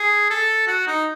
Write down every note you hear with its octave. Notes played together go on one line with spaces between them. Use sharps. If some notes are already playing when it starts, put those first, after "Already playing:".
Already playing: G#4
A4
F#4
D#4